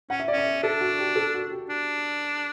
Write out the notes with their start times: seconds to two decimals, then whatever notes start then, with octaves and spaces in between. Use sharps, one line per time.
0.10 C#4 F#5
0.20 E5
0.28 D5
0.33 C#4 E5
0.63 D4 A4
0.81 F#4
0.99 G4
1.16 A4
1.34 F#4
1.51 G4
1.70 D4